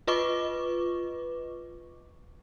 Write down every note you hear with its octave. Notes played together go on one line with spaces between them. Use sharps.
F4 B4 D#5 C#6 D6